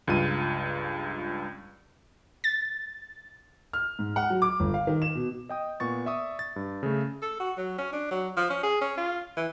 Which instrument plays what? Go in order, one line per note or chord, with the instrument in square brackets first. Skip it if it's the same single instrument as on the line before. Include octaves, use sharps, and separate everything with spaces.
[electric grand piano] C#2 G2 F4 D#7
[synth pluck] A6
[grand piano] F6
G#2
F#5
F#3
D6
G1
F5
D#3
E7
B2
[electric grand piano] D#5 G5 D#6
A#2 B3 C#6 A6
D5 E5 C#6 D#6
A6
G2
C#3 A3
[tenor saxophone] A4
F#4
F#3
C#4
D4
F#3
F3
C#4
G#4
C#4
F4
E3